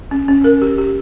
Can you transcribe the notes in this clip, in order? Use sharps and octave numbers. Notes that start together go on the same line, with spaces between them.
C#4
C#4
A#4
G4
G4